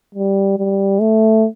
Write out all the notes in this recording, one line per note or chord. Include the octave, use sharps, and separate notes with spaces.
G3
G3
A3